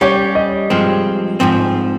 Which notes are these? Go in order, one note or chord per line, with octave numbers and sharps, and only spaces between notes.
G3 C#4 G4 C#5
D#5
G2 F3 G#3 C4
G#2 F3 C4